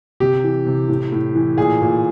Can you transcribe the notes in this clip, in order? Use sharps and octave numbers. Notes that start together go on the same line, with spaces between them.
C3 G4
E3
C3
A2
A2
E3
A#2 G#4
A#2